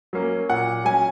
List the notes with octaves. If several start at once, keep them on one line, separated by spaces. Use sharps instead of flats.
F#3 A#3 C#4
A#2 F#5
F#3 C#4 G#5